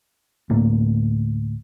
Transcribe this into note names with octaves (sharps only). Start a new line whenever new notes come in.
D2 A2 A#3